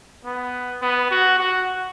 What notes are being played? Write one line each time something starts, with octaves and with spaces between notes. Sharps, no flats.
B3
B3
F#4
F#4